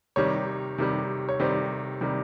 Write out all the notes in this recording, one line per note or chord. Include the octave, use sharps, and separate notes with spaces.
C3 D#3 G3 C#5
C3 D#3 G3
C#5
C3 D#3 G3 C5
C3 D#3 G3